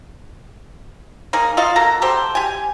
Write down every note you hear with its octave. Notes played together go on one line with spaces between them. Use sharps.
A#3 D#4 G#4 A#4
F4 F#4 D#5 F5
A#3 F#4 A4 A#5
F#4 G4 A4 C5
G4 G#5